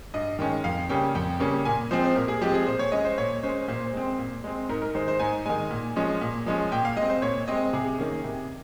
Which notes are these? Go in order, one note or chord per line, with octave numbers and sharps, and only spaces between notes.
G2 D#5
D#3 G#3 C#4 G5
F2 F5
C#3 G3 A#3 C#4 G5
F2 G5
C#3 G3 A#3 C#4
A#2 G#5
F3 G#3 C4 C5
C5
A#2 A#4
G#4
F3 G#3 C4 G4
G#4
A#2 C5
C#5
G#3 C#4 D#5
C5
A#2 C#5
G#3 C#4 C5
A#2 C5
G#3 C4
A#2
G#3 C4
G#2 A#4
A#4
D#3 G#3 C5
C5
G#2 G#5
D#3 G#3 G#5
A#2
F3 G#3 C#4
A#2
F3 G#3 C#4
A#2 G5
F5
G#3 D#5
C4
C5
A#2 C#5
G#3 C4 D#5
C3 G#4
D#3 A#3 C#4
C3